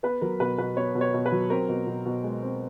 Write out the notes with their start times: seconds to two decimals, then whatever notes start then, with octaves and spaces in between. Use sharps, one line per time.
0.03 B3 B4
0.21 F#3 A#4
0.40 B2 B4
0.58 B2 B4
0.77 B3 C#5
0.95 B2
1.01 C#5
1.14 B2
1.26 B4
1.32 F#3
1.50 C4 A#4
1.69 B2
1.87 B2
2.05 B2
2.23 G#3
2.42 C4